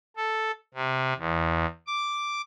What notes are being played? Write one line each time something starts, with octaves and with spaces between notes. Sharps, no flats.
A4
C3
E2
D6